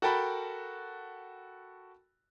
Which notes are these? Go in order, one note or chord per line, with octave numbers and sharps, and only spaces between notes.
F#4 A4 A#4 G5 A5 B5